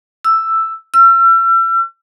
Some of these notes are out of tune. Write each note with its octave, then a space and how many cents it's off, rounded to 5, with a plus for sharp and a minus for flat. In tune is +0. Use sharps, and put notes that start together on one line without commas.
E6 +5
E6 +40